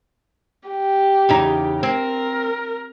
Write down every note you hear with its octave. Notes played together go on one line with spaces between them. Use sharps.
G4
E2 C#3 D#4
C4 A#4